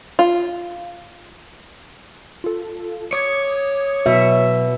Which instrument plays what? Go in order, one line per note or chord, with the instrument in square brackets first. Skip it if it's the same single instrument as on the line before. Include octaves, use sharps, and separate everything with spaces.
[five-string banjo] F4
[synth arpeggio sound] F4 A4
[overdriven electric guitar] C#5 [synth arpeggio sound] D6 D#6 G#6
[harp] B2 [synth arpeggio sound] F#3 [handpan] E5